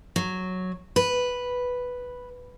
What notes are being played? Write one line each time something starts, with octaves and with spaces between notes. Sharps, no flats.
F#3
B4